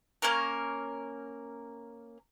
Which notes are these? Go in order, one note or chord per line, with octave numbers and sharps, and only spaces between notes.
A#3 C#4 A#4